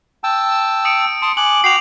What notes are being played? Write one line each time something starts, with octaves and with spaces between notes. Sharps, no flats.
G5 A5 E6
D#6 C#7 D7
A5 C6 D#6 D7
G#5 D6 F#6 F#7
F#4 G5 D6 C7 F7